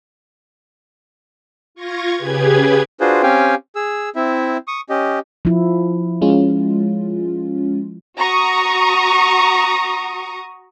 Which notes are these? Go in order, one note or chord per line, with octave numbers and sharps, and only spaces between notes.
F4 C#6 G#6 A#6
C#3 G4 G#4 B4 G#6
D4 F4 F#4 G#4 B4 C5
C4 C#4 G4 F5 G5 G#5
G#4 E6
C4 E4 E5
C#6 D#6
C#4 G4 D#5
F3 E4
G#3 C#4 F4
F#4 A#5 C#6 D#6